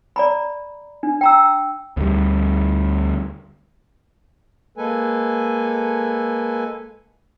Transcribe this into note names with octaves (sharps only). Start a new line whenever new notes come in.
D5 A#5 B5
D4
G5 A#5 E6
D2 G3
G#3 A#3 A4 B4 G#5